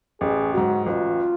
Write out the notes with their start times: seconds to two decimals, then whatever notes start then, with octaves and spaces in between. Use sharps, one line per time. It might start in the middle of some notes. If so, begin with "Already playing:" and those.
0.21 A1 G#4
0.53 G#2 F#3 F#4
0.85 A1 F4